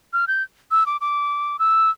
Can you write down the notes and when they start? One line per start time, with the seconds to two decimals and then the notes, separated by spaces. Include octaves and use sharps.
0.13 F6
0.28 G6
0.71 E6
0.86 D6
1.01 D6
1.59 E6